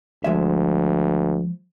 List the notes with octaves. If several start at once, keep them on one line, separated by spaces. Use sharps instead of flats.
D2 F3 G#3 E5